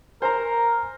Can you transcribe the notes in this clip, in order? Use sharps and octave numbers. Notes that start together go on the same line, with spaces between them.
A#4 C5 G#5 A#5